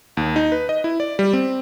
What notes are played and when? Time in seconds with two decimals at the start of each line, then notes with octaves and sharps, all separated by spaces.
0.17 D#2
0.36 D#4
0.52 B4
0.69 D#5
0.84 E4
1.00 D5
1.19 G3
1.33 C4